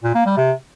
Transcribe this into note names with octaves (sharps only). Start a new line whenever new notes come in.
A#2
A#3
G3
C3